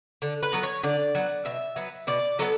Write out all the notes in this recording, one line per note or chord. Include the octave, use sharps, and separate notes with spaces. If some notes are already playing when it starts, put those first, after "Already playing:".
D3
B4
F#3 B3
C#5
D3 D5
F#3 B3
B2 E5
F#3 B3
B2 D5
F#3 B3 A4